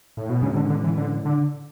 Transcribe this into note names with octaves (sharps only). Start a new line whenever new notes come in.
A2
B2
A2 C#3 G#3 C#4
D3
D3
E3
D3
D3